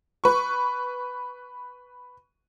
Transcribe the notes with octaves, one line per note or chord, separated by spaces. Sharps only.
B4 C#6